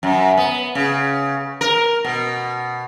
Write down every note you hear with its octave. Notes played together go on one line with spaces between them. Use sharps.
F#2
B3
C#3
A#4
B2